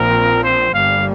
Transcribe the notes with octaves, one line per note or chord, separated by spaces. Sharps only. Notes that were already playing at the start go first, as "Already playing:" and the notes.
Already playing: A#1 A#2 F3 C4 A#4
C5
G1 G2 G3 A#3 F5